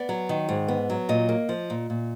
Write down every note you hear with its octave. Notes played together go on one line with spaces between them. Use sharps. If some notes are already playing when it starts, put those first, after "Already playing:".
Already playing: B3 D5
F#3
D#3
G#2
B3
F#3
A#2 D#5
A#3
F3
A#2
A#2